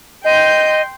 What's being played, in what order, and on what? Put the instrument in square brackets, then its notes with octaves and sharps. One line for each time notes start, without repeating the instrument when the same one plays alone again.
[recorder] D#5 [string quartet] G5 C6 G6